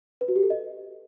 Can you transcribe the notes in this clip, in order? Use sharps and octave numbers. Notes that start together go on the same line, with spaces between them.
B4
F#4
G4
A4
D#5